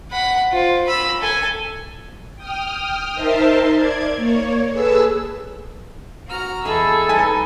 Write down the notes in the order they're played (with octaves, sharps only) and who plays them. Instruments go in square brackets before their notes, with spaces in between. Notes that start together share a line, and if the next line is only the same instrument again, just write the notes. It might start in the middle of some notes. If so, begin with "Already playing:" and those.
[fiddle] F#5 B5
F4 C5
B5 E6
A4 G#5
[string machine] G5 D#6 F6
D#4 A#4 C5 E5 A5 C6
D5 G#6
A#3 C#5
G#4 A4 B4 E6
[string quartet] F#4 A#5 F6
[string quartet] E2 G#4 E6 [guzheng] E4 D#5 F5 [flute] A4
[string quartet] G3 D#4 [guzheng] B4 D#5 A5 [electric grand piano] G#5